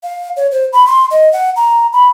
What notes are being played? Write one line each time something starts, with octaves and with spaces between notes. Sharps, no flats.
F5
C#5
C5
B5
C6
D#5
F#5
A#5
B5